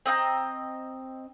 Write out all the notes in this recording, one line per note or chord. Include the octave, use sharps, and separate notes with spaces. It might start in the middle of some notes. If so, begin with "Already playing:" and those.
C4 D#5 F#5 A#5